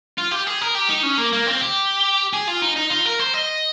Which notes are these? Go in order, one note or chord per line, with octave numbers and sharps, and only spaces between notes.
F4
G4
G#4
A#4
G4
D#4
C#4
A#3
A#3
C4
G4
G#4
F4
D#4
D#4
F4
A#4
C5
D#5